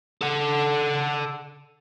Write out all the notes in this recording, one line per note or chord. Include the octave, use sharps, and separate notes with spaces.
A4 F#5